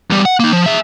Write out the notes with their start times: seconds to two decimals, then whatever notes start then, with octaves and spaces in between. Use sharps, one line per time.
0.10 E2 G3
0.25 F#5
0.40 A#3 D#4
0.53 F3
0.66 G#4 E5